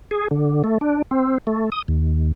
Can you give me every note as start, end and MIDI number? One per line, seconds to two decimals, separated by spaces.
0.11 0.28 68
0.31 0.63 50
0.64 0.78 57
0.81 1.02 62
1.11 1.38 60
1.47 1.70 57
1.72 1.82 87
1.88 2.32 39